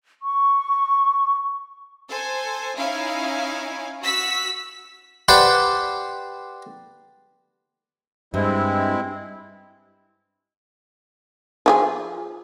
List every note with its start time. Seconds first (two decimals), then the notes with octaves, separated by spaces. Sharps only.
0.23 C#6
2.08 A4 C5 G#5
2.77 C#4 D#4 E4 F5 G#5
4.02 F#4 E6 B6
5.28 G4 B4 C5 D5 F#5
8.34 G2 G#3 C4 E4
11.66 F3 G4 G#4